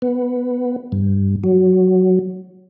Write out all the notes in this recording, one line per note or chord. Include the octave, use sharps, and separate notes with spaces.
B3
G2
F#3